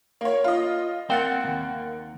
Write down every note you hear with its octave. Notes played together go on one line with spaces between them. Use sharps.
A#3 C#5
F4 D#5
A#3 C4 F#5 G5 A6
D#2 G#2